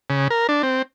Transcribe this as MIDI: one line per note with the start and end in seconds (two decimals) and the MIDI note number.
0.10 0.28 49
0.30 0.47 70
0.49 0.62 62
0.63 0.82 60